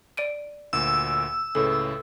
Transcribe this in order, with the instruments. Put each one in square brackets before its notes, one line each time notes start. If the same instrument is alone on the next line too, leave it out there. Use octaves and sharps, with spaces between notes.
[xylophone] D5 D7 D#7
[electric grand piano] D2 A#2 [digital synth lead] E6
[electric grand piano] C#2 A2 C#3 [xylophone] A4 B4